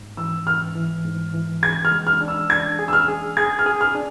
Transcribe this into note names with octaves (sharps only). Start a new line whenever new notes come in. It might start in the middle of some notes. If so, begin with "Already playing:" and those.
Already playing: G#2
E3 E6
G#2 F6
E3
G#2
E3
G#4 G#6
F6
G#3
F6
D4
E6
D4 G#6
G#4
E6
F6
G#4
G#4 G#6
F6
G#4
F6
D4